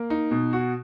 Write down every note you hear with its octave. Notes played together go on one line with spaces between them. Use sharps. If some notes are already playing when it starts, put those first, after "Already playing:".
Already playing: A#3
D#4
B2
F#4